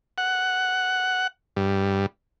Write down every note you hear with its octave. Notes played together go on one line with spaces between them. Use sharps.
F#5
G2